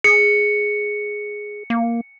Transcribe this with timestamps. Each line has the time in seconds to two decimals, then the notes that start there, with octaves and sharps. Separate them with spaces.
0.04 G#4 C#7
1.70 A#3